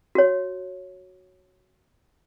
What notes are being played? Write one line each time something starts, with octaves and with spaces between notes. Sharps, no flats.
F#4 C#5